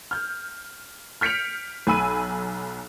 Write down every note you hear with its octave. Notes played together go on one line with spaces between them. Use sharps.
F6 G6
F6 G6 B6 C#7 D7 F7
B1 G#5 B5 E6 D#7